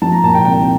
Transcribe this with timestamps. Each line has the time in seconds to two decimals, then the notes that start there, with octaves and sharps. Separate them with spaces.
0.02 F3 A5
0.12 A#5
0.23 A#2 A5
0.35 G5
0.45 C2 G5